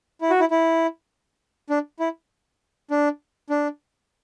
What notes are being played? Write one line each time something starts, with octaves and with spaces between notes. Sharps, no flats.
E4
F#4
E4
E4
D4
E4
D4
D4